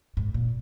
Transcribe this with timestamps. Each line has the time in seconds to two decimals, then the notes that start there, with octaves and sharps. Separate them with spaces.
0.17 G#2
0.34 A#2